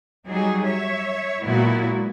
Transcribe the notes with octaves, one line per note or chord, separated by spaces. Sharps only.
F#3 G3 D#4 G#4
C#5 E5
A#2 F#3 G#3 B3 E4 F#4